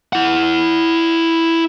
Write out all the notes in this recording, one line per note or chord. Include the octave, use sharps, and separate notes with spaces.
E4 F#5